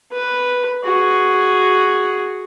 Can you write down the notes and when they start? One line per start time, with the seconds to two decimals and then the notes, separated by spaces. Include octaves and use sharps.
0.12 B4
0.84 F#4 G#4